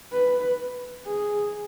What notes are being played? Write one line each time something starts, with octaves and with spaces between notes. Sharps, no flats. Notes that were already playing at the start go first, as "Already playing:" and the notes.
B4
G#4